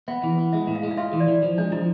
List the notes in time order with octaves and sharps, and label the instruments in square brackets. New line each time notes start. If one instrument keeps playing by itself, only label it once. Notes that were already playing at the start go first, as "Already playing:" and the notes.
[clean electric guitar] B3 [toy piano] E5
[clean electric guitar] E3
B3
[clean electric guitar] G#3 [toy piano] E5
[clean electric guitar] A2
[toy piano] F5
[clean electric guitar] G#3
[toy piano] F5
[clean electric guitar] F4 [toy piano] E5
[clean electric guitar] E3
[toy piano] D5
[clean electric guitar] E3
F3
[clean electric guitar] G#3 [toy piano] D4
[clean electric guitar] F3 [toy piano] E4